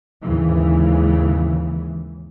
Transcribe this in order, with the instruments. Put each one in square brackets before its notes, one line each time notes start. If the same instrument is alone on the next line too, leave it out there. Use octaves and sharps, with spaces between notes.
[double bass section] D#2 G#2 C#3 E3